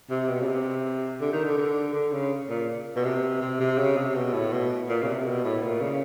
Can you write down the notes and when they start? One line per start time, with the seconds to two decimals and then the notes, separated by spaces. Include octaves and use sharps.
0.10 C3
0.28 B2
0.41 C#3
0.46 C3
1.20 D3
1.32 D#3
1.44 D3
1.57 D3
1.94 D3
2.12 C#3
2.49 A#2
2.96 B2
3.04 C3
3.41 C3
3.60 C3
3.78 C#3
3.97 C3
4.15 B2
4.34 A2
4.52 B2
4.89 A#2
5.02 C#3
5.07 C3
5.26 B2
5.44 A2
5.62 A#2
5.81 C#3